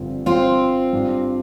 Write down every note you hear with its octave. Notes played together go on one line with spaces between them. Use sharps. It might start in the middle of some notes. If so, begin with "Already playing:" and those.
Already playing: G1 G2 D3 F3 C4
C4 F4
G2 G3 D4 G4